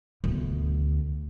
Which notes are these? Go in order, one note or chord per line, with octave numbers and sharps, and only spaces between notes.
D2 B3